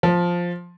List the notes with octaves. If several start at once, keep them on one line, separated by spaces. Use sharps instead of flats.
F3